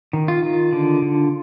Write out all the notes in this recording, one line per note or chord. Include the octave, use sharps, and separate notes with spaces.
D#3
F4
D#3
D3
D3